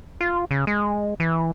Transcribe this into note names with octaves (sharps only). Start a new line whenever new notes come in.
F4
C#3
G#3
E3